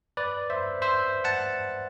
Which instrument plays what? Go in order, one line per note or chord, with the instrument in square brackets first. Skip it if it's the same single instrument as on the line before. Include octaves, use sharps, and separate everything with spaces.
[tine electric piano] B4 D5
C5 E5
C5 E5
F#5 A5